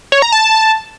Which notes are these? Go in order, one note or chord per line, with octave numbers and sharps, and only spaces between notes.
C#5
A#5
A5